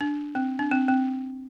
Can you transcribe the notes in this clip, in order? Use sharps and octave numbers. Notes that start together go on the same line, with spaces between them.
D4
C4
D4
C4
C4